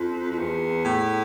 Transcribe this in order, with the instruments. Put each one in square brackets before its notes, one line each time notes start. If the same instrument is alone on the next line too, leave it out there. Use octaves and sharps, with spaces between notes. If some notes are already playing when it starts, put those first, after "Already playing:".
Already playing: [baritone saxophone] F2
F2
E2
A2